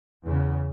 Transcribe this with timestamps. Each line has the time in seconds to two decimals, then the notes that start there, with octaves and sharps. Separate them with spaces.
0.24 E2 C#3